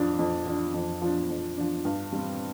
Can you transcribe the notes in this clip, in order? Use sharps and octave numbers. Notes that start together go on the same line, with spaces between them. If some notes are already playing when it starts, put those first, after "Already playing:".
Already playing: F2 F3 D4
F2
F3 D4
F2
F3 D4
F2
F3 D4
G2
G3 C4